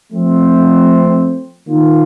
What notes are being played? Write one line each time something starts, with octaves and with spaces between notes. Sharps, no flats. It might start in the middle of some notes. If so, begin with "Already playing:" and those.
F3 A3 C4
D#3 A#3 F4